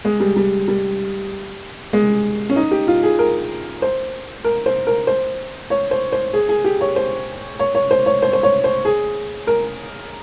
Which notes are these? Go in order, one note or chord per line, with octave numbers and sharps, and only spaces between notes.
G#3
G3
G3
G3
G#3
C#4
D#4
G4
F4
G#4
A#4
C5
A#4
C5
A#4
C5
C#5
C5
C5
G#4
G#4
G4
C#5
C5
C#5
C#5
C5
C#5
C5
C5
C#5
C5
G#4
A#4